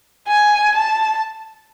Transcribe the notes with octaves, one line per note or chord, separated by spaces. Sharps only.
G#5
A5